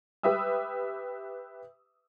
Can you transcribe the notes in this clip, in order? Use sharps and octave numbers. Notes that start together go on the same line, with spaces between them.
G4 B4 E5 D#6 E6